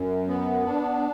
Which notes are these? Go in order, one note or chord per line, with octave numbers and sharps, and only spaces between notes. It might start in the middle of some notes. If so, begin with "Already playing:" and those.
Already playing: F#2
B3
D4